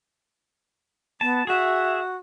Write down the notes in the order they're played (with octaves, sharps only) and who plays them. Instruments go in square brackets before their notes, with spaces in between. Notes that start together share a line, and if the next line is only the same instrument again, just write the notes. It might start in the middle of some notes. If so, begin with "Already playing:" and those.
[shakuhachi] B3 [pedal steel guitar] A5
[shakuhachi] F#4 [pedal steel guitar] G#4 E5